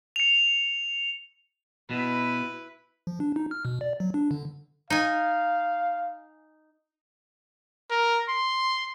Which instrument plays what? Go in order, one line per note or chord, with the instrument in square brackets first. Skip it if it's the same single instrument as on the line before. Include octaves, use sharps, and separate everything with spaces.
[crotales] C#7 F7
[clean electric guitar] B2 [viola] E4 B4
[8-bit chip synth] F3
D4
D#4
F6
B2
D5
F#3
D4
D3
[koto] D#4 G#5 [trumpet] F5
[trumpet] A#4
C6